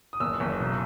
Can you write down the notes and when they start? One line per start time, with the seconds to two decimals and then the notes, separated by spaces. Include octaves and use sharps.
0.13 D#6
0.20 F#1 E6
0.40 F#1
0.60 B1